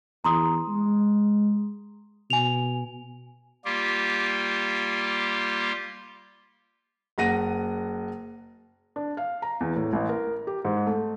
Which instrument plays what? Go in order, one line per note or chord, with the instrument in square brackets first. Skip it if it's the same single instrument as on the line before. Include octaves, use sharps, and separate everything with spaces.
[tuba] E2 [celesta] A#5 C6 D#6
[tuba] G#3
[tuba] B2 [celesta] G#5 F7
[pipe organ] G3 A#3 F4 G4
[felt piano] F#1 F#5 A#6 D#7
D4
F5
A#5
E2
A2
A1
A#4
G4
G#2
A3